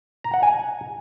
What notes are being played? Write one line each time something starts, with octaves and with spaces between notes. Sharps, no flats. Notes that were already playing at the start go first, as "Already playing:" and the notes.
A#5
F#5
G#5